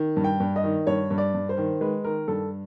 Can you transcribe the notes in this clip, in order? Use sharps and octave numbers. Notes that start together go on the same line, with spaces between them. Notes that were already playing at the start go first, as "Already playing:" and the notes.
Already playing: D#3
G2
G5
G2
D#5
D#3
G2 C#5
G2
D5
G2
C5
D#3
G#3 B4
D#3 A#4
G2 A4